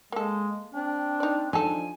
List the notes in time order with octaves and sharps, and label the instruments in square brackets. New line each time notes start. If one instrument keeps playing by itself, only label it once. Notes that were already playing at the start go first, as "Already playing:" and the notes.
[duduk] G#3 [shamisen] A#3 A4
[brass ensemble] C4 G5 [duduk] D4
[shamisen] D#4 D5
[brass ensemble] F3 D4 [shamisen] D#4 A4 [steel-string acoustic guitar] G#5